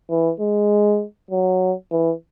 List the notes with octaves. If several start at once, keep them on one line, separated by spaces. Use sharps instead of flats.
E3
G#3
F#3
E3